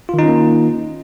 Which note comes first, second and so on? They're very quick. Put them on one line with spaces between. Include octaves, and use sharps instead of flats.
F4 D#3 D#4 C#4 A#3